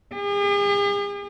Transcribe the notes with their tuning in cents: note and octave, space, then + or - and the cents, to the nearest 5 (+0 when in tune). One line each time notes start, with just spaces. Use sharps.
G#4 -45